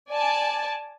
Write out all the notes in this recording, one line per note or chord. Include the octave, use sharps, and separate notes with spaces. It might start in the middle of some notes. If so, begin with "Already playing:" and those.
D5 G#5 A5